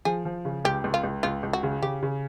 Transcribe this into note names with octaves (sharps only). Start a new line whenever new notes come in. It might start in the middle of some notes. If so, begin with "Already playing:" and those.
F3 G#4
F3
C#3
C#2 G4
C#2
F4
C#2
C#2 F4
C#2
F#4
C#3
C#3 G4
C#3